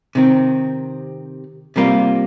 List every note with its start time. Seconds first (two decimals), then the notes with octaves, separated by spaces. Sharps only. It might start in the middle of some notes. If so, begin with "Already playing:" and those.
0.15 C3 D#3 C4
1.76 C3 G3 A#3 F4